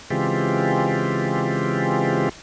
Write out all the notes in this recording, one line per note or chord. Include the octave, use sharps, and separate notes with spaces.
C#3 E3 G#3 C4 F4 G4